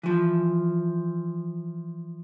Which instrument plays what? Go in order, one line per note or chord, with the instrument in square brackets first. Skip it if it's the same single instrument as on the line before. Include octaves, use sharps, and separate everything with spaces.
[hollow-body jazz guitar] E3 F3